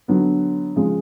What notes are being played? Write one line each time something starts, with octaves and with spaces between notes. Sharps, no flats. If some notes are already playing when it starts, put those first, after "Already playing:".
D3 F#3 B3
C#3 F3 G#3